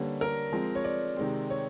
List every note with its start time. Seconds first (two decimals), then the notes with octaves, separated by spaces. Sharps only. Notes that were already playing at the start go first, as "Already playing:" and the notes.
Already playing: D3 G3 A#3 C#4 B4
0.21 A#4
0.52 F3 G#3 C4
0.75 C#5
0.85 D5
1.17 C3 D#3 G#3 C4
1.50 C#5